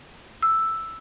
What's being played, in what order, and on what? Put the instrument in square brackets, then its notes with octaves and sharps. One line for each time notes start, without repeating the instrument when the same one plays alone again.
[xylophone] E6